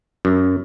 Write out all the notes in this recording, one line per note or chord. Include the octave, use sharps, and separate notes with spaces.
F#2